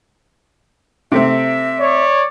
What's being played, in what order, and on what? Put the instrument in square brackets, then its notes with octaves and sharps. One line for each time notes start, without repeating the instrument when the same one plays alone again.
[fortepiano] C3 A3 C4 [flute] E5
[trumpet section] C#5 D5